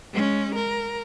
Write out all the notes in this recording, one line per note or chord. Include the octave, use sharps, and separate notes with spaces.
G#3 C#4
A#4